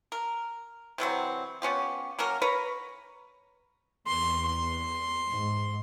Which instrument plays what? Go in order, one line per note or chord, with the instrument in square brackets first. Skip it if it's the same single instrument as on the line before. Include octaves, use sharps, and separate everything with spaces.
[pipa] A#4
C3 E3 F#3 C4
B3 C#4 F4 G4
F#3 A#3 C#4 A#4
A#4 B4 C#5 A#5
[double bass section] E2 [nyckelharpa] C6
[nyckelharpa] C6
[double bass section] G#2